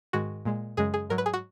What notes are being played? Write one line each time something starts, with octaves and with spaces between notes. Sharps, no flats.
G#2 D#3 G#3 F#4
A#2 G#3
F#2 C#3 G#3 G#4
G#4
G#2 F#3 A#4
B4
G#4
F#4